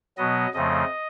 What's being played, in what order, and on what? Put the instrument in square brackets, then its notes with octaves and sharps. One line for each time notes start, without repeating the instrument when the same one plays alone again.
[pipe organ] B2 F#3 B3 D#5
F2 C#3 F3 A3 C4 D#5